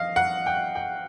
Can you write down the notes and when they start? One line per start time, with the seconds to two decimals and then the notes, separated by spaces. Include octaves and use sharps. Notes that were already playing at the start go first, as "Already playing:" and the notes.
Already playing: F3 D#5 F5
0.16 F#5
0.46 G5
0.75 G5